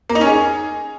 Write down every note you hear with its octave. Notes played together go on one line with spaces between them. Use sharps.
A#3
D#4
C#4
G#4